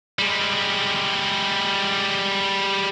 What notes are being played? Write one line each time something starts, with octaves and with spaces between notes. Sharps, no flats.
G3 G#3